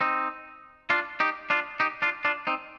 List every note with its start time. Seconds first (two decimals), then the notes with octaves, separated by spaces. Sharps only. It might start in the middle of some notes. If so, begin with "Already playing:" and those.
0.01 C4 D#4
0.90 D4 F4
1.20 D#4 G4
1.50 D4 F4
1.80 D#4 G4
2.02 D4 F4
2.25 D4 F4
2.47 C4 D#4